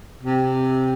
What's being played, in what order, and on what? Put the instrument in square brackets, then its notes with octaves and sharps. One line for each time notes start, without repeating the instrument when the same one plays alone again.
[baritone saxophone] C3